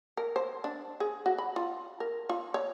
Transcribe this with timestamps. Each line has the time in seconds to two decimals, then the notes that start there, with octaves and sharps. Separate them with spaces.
0.17 A#4
0.36 C5
0.64 D4
1.00 G#4
1.26 F#4
1.38 B5
1.56 F4
2.00 A#4
2.29 F4
2.54 C#5